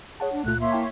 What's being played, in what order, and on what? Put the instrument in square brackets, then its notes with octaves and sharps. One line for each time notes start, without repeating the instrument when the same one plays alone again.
[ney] G#4 [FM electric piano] C#5 F#5 A5
[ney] D4
[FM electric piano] C#2 A#2 F4 [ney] A3 [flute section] F#6
[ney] A#3 [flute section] C#5 E5 C6
[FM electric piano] E4 G5 A5